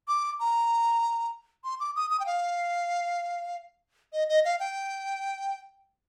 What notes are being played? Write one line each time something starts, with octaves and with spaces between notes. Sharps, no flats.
D6
A#5
C6
D6
D#6
D#6
G5
F5
D#5
D#5
F5
G5